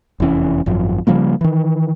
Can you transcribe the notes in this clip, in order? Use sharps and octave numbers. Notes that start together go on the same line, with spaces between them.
F1 E2 E3 C#4
G#1 F#2 F3
C#3 F3 G3 A#3
D#3 E3